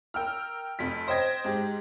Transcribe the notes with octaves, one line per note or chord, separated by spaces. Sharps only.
A#4 G5 E6 F6
F1 F2 B6
C5 D#5 G5 G#6 A#6
G#2 G4